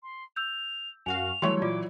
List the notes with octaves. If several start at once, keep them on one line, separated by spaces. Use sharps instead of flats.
C6
E6 G6 F7
F#2 F#4 F5 G#5 F7
E3 F#3 G3 A3 C#5 C6 C#6
A#2 F4 D5 D6